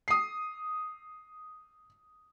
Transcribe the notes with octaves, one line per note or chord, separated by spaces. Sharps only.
D#6 C7